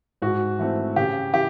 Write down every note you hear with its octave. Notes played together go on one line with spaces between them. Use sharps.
G#2 F#4
E3 A3 C4
C#3 G4
E3 G4